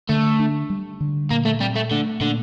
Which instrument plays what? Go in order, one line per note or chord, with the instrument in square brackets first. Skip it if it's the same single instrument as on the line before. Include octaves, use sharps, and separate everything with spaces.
[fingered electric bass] D3 [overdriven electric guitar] A3
[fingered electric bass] D4
G3
D3
[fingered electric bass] A#2 [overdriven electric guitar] A#3
[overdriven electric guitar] A3
[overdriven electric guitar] G3 [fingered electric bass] C4
[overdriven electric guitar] A3
[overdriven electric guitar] D3 [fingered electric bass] A3
[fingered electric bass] A#2 [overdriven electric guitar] D3